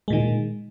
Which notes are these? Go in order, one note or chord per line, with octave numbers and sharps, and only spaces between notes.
A#2 D#3 G#3